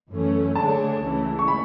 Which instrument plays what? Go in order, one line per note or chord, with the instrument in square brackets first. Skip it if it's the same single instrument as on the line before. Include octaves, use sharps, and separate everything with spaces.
[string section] F#2 E3 A3 C#4
[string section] D3 A3 D4 G#4 C#5 [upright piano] A5
[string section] C#2 C#3 E3 A3
[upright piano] C#6
B5